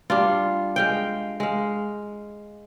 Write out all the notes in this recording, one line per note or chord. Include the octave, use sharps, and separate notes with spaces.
G3 D4 F4
G#3 F5 G5
G#3 F5